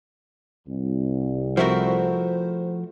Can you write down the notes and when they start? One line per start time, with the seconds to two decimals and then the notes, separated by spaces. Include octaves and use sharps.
0.67 C2
1.57 F3 A3 C4 E4 F#4 A#4 C5